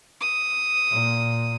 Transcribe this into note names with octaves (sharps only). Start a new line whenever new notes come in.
D#6
A#2